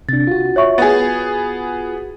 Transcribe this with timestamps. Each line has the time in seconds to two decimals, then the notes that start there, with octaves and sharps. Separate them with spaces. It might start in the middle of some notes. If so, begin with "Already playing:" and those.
0.09 C3 D4 A6
0.27 F4 F#4
0.56 C#5 E5 C#6
0.78 B3 G#4 A6